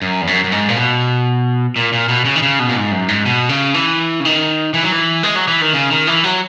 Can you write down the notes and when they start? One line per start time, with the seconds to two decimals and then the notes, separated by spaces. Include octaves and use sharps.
0.02 F#2
0.22 E2
0.27 F#2
0.44 F#2
0.52 G#2
0.68 A#2
0.76 B2
1.76 A#2
1.93 A#2
2.08 B2
2.25 C#3
2.36 D#3
2.42 C#3
2.59 B2
2.69 A#2
2.76 G#2
2.91 F#2
3.08 G#2
3.26 B2
3.49 C#3
3.74 E3
4.20 C#3
4.25 D#3
4.74 E3
4.84 F#3
4.92 E3
5.23 G#3
5.36 F#3
5.48 E3
5.61 D#3
5.73 C#3
5.90 D#3
6.07 E3
6.24 F#3